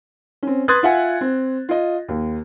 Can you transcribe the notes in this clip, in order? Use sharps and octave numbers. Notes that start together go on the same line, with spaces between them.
C4 C#4
B4 C6 D#6 F#6 G#6 A6
F4 E5 F#5 G#5
C4
F4 D#5
D#2